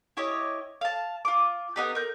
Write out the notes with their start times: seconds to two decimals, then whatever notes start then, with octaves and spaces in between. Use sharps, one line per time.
0.17 E4 G4 C#5 D#5
0.81 F5 A5
1.25 F4 D6
1.76 B3 D#4 G4
1.95 A#4 G6